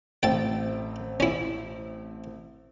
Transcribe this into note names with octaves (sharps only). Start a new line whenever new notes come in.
A1 A3 C4 G5 A5
C#4 E4